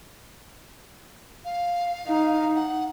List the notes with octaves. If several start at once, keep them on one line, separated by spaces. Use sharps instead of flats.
F5
D#4
F#5